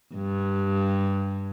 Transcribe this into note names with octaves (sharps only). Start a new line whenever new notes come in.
G2